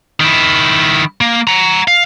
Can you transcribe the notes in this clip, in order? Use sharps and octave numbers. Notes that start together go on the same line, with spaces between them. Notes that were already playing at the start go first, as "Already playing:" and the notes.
D#3 E4
A#3
F#5 A#5
F5